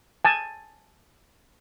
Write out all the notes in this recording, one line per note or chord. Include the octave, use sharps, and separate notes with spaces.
G#5 A5